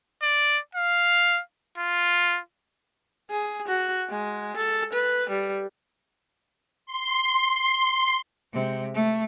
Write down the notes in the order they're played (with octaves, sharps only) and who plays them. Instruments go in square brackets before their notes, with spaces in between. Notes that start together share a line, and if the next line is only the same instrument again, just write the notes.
[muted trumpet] D5
F5
F4
[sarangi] G#4
F#4
G#3
A4
B4
G3
[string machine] C6
[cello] C3 G#3
A3